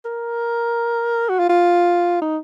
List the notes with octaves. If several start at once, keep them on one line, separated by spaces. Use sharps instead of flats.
A#4
F#4
F4
F4
D#4